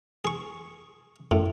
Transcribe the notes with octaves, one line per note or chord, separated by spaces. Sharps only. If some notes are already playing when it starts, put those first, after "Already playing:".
G#4 C#6
F#2 A2